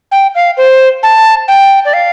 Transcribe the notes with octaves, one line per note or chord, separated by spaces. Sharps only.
G5
F5
C5
A5
G5
D5
F5